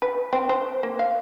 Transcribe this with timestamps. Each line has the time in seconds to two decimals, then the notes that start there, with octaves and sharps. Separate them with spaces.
0.02 B4
0.33 C4
0.49 C5
0.83 A#3
0.99 F5